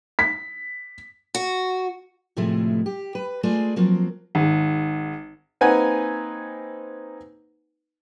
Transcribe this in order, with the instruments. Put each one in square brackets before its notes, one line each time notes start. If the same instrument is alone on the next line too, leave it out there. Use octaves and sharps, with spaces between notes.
[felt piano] B6
[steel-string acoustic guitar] F#4
A2 C3 F3 G#3 A3 E4
G4
B4
G#3 A3 F4 G#4 A4 D5
F3 F#3 A#3 C4
[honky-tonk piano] G#1
[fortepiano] A#3 C4 D#4 B4 F#5 G#5